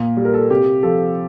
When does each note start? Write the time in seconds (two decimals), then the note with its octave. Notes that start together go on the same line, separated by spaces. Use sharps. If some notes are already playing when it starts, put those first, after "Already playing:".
Already playing: A#2
0.17 G3
0.25 A#4
0.34 A4
0.50 C3 G4
0.83 F3 A4